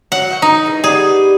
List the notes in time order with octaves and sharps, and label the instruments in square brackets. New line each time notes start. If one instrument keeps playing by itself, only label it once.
[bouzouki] F#3 [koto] F#5
[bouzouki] F#4 E5 G5
[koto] D#4 [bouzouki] A#4
[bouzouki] E3 G#3
[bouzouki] G3 B3 G4 [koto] G#4